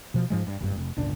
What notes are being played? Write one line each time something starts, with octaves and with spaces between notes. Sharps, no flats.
B2 F3
G#2 F3 G#3
G2
F#1 G2
F1
G1 C#2 A#2 D4